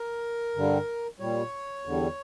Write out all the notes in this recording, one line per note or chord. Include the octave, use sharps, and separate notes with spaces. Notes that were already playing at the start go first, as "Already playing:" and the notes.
Already playing: A#4
G2 D3 G3
A#2 G3 C#5
E2 D3 G3